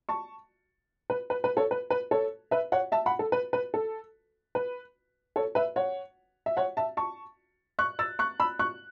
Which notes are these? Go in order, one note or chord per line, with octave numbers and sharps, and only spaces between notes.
A5 C#6
B4
B4
B4
A4 C#5
B4
B4
A4 C#5
B4 E5
C#5 F#5
E5 A5
F#5 B5
A4
B4
B4
A4
B4
A4 C#5
B4 E5
C#5 F#5
E5
C#5 F#5
E5 A5
A5 C#6
C#6 F#6
E6 A6
C#6 F#6
B5 E6
C#6 F#6